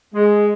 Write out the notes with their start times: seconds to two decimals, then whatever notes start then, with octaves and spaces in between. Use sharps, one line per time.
0.14 G#3